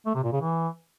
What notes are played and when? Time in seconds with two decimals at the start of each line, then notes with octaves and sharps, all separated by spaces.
0.06 A3
0.15 C3
0.24 A#2
0.33 C#3
0.41 E3